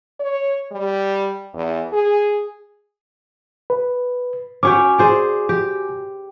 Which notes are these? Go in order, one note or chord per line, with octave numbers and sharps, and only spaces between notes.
C#5
G3
E2
G#4
B4
C#4 F#4 C#5 G5 G#5 D6
G#4 C5 D5
G4